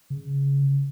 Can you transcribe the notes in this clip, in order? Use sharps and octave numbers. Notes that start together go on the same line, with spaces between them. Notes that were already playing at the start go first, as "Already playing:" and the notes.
C#3